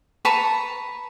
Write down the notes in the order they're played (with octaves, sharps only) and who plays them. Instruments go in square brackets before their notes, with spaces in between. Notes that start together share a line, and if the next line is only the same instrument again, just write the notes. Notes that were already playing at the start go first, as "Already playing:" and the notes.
[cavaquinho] B4 A5 A#5 C#6